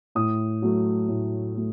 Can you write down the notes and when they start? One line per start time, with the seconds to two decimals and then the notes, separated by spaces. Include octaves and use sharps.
0.15 A2 D#6
0.62 F#3 A3
1.08 A2
1.55 F#3 A3